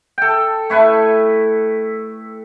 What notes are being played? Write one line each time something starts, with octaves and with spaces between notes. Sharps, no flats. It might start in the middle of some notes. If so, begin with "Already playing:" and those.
A4 G5
A3 E4 B4 C#6